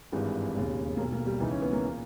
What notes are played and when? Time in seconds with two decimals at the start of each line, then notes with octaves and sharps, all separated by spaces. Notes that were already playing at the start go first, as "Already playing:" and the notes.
0.12 G#1 G2 E3 G#3
0.55 E1 D#2 C#3
0.97 B1 B2 A#3
1.13 A#3
1.26 G3
1.40 C#2 C#3 E3 D#4
1.51 C#4
1.62 B3
1.73 A#3
1.86 A#2